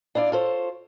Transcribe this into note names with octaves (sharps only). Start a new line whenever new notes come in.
D4 E4 F4 D5
F4 A4 C5 C#5